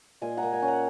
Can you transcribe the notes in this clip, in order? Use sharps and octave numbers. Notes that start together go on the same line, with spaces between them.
A#2 D#5 G#5
F#5 A#5
A#3
D#5 G#5
C#4
F#5 A#5